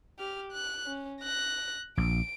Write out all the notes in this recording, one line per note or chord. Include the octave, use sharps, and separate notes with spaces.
G4 F6
F#6
C#4
F#6 A#6
A#1 D7